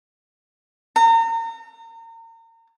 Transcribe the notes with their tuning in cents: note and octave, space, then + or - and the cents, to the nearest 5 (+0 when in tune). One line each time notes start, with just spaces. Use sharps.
A#5 -35